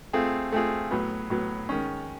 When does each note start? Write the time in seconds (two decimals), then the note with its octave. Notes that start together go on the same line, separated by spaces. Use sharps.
0.13 A3 C4 F4 G#4
0.52 A3 C4 F4 G#4
0.91 A2 F#3 B3
1.30 A2 F#3 B3
1.69 D#3 G#3 C#4